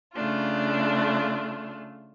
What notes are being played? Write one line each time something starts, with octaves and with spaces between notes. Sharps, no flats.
C#3 A3 D4 F4